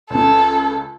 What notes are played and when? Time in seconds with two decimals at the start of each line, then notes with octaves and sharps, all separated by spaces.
0.10 C#2 C#3 A4